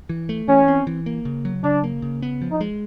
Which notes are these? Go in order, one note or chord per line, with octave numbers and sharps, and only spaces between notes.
E3
A3
E3 C#4
C4
E3
A#3
C#3
F#3
C#3 D4
A#3
C#3
B3
F3
D#4
G#3